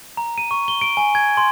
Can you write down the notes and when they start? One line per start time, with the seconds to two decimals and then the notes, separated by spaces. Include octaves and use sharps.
0.17 A#5
0.38 D#7
0.51 C#6
0.68 G7
0.81 D7
0.97 G#5
1.15 G#6
1.37 C6